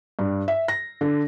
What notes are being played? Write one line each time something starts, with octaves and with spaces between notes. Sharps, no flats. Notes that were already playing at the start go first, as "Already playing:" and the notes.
G2
E5
A#6
D3